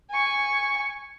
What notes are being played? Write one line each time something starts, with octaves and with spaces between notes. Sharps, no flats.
G#5 C#6